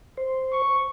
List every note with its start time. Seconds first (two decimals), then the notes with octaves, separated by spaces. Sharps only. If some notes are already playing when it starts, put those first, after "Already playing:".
0.17 C5
0.52 C#6